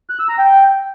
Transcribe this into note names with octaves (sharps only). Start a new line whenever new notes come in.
F#6
E6
A#5
G5